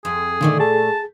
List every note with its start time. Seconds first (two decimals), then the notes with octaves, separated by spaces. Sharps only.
0.05 F2 G#4
0.41 A#2 D3 D#3 A3 D5
0.60 G#4 A5